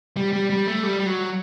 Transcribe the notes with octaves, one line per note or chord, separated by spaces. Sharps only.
G3
G3
G3
A3
G3
G3
F#3